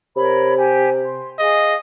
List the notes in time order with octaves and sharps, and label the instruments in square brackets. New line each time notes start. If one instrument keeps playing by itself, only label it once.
[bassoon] C3 [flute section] A#4 C#5 B5
[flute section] G4 G#5
C6
[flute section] G#4 F5 [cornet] D#5